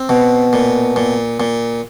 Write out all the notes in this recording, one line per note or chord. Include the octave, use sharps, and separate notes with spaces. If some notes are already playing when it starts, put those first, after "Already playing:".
Already playing: C4
B2
A#2
A#2
A#2